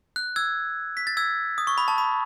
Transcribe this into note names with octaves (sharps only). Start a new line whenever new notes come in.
F#6
E6 G#6
B6
A6
E6 G#6
D#6
C#6
B5
A5
B5